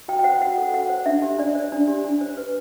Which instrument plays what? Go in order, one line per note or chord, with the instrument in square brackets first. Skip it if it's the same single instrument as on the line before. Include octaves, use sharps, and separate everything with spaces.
[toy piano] F#4 G5
G5
C5 F#5
F#4 F#5
A4
F#4 F#5
C5
D4 E5
G4
D4 D5
C5
D4
G4
D4
C5
B4